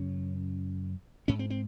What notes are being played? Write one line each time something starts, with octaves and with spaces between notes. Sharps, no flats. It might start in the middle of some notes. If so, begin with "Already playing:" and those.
Already playing: F#2 C#3 C#4
G#2 C#4
C4
C4